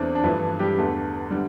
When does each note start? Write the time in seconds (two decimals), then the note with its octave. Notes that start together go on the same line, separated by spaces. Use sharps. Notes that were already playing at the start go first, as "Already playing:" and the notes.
Already playing: E2 E3 A3 C4 D4
0.15 D4
0.24 G2 E3 F3 A3 E4
0.59 G3 G4
0.78 E2 D3 A3
1.31 D3 G3